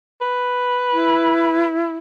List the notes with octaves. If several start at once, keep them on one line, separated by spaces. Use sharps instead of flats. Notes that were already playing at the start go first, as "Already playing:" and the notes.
B4
E4